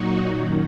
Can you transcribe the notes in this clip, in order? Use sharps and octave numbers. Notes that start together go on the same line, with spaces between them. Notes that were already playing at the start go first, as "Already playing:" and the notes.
Already playing: A#2 F#3 D#4 F#4
F#2 D#3 F#3